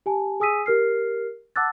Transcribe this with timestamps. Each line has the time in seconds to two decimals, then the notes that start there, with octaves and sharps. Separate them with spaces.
0.06 G4 G#5 A5
0.40 G#4 G#5 D#6 E6 B6 D#7
0.66 G4 A#4 F6 C7
1.56 F#5 A5 D6 E6 F#6 A6